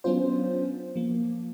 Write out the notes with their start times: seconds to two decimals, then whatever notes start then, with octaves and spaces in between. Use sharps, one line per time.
0.04 F#3 B3 C#4 D4 F4 C5
0.96 F3 A#3